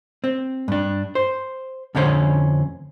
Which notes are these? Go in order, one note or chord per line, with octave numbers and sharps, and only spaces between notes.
C4
G2 D4
C5
F2 D3 C#4 G4 C5